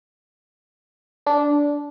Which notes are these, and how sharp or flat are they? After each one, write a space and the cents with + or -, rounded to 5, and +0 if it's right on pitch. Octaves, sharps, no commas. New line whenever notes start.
D4 -15